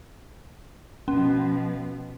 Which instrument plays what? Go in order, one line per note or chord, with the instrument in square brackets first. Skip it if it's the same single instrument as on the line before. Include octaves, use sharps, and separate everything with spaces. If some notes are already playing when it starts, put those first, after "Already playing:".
[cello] B2 F3 [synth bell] C#4